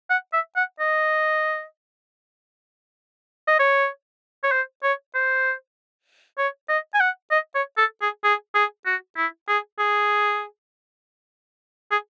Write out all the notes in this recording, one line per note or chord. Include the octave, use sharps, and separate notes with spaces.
F#5
E5
F#5
D#5
D#5
C#5
C#5
C5
C#5
C5
C#5
D#5
G#5
F#5
D#5
C#5
A4
G#4
G#4
G#4
F#4
E4
G#4
G#4
G#4